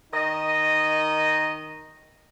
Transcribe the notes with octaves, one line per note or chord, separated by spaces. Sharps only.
D#3 D#4 D#5